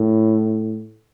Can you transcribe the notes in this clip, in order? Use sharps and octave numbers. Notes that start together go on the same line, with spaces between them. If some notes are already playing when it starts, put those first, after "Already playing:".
Already playing: A2